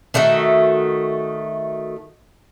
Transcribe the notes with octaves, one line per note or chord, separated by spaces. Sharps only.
D#3 A3 F#4 E5